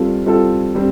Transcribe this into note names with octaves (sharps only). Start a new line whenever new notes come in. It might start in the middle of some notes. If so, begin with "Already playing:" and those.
Already playing: G3 C4 F4 A4
G3 C4 F4 A4
G3 C4